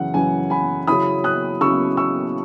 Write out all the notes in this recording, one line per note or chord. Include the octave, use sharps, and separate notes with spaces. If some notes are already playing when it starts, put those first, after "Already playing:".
Already playing: F#2 C#3 E3 F#5
F#2 C#3 E3 G#5
G#5 B5
C#3 F#3 C#4 E4 B5 D#6
D#6 F#6
C#3 F#3 C#4 E4 C#6 E6
C#6 E6